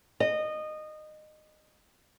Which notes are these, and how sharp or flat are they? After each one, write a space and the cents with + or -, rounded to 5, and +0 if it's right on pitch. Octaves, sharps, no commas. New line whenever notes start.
D#5 -20